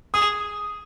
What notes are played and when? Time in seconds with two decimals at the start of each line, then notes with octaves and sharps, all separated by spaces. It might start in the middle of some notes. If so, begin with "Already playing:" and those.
0.14 G#4 D#6